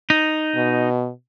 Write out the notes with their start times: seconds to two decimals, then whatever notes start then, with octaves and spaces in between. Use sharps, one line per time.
0.10 D#4
0.55 B2